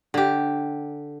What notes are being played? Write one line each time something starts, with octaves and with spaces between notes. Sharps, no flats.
D3 G4